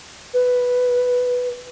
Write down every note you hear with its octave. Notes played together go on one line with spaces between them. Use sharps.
B4